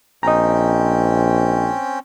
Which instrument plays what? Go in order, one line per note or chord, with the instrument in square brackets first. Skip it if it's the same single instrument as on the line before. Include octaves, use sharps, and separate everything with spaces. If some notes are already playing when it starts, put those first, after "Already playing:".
[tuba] A#1 [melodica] C4 C#4 G5 [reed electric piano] D#5 A#5